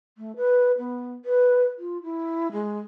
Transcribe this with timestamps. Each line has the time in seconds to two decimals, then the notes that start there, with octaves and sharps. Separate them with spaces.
0.18 A3
0.36 B4
0.78 B3
1.25 B4
1.78 F4
2.03 E4
2.52 G#3